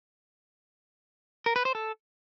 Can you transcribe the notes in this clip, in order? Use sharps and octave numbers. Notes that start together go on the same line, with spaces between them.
A#4
B4
C5
A4